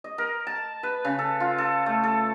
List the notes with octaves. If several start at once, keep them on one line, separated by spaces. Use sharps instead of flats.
D#5
A#4
A5
B4
C#3
A4
F4
A4
A3
A4